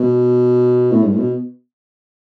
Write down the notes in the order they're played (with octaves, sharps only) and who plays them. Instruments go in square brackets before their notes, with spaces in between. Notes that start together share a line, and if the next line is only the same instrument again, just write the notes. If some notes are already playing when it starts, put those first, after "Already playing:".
Already playing: [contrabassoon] B2
A2
G2
A2
B2